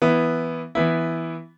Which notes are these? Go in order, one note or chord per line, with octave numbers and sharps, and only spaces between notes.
E3 B3 E4
E3 B3 E4